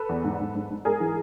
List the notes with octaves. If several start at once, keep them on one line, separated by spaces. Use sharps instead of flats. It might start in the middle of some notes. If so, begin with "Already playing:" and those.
Already playing: A4 B4
E2
G#2
G#2
G#2
G#2
G#2 G#4 A#4
E3